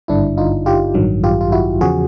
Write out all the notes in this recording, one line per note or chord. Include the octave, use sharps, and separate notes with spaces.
G#1 G2 D3 D4 E4
D#4 F4
F4 G4
A1 G2 D#3 F#3
F4 G4
F4
E4 F#4
E2 C#3 F3 F#4 G#4